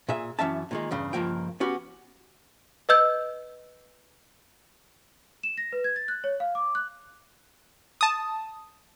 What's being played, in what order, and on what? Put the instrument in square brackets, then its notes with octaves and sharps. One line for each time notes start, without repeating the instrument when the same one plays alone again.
[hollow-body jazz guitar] A#2 G#4 E5
F#2 E3 C#4 E5 A5
A#2 D#3 G#3
E2 G2 C#3
C#2 G2 F3 A#3 A#4 G5
B3 C#4 F#4 G4
[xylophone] B4 D#5 E6 G6
[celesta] E7
A#6
B4
G#6
A6
F#6
C#5
F5
D6
F#6
[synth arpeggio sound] A5 D#6